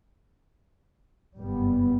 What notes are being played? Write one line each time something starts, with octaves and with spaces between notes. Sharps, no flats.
F#1 G2 G3 B3